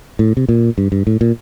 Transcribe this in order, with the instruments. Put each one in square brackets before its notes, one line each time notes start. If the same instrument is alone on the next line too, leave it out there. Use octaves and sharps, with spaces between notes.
[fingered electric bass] A2
C3
A#2
G2
G2
A2
A#2